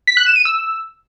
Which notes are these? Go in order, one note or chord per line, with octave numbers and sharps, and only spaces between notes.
B6
F#6
E7
D#7
E6